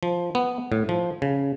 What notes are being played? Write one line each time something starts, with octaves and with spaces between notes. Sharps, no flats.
F3
B3
A2
F3
C#3